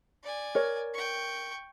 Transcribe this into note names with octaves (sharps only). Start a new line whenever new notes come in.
D5 G#5
A#4 C#5
G5 C#6